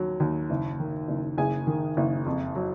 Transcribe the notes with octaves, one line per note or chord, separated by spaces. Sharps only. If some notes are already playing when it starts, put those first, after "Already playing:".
Already playing: D#2 F#3
D#2
F#1
D#3
F#1
F#1 G#4 G#5
D#3
F#1
F2
F#3